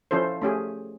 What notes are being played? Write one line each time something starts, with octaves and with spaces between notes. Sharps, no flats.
F3 C#4 E4 A4 C5
A3 C#4 G4 G#4